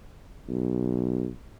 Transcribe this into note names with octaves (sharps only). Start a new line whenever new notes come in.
B1